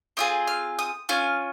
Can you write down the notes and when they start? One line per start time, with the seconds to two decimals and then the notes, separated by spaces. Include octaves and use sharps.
0.17 C4 F4 G#4 D#6
0.47 F6
0.79 D#6
1.09 C#4 F4 F6